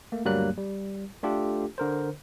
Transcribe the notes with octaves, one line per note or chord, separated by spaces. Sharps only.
A3 A#3
D2 G2 F#3 G3 A#3 F#6
G3
A3 D4 F4 G4 A4
D3 A#4 C5